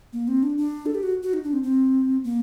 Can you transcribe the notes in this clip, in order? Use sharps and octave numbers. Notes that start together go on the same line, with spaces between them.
A#3
C4
D4
D4
A4
G4
F#4
F#4
D#4
D4
C4
C4
A#3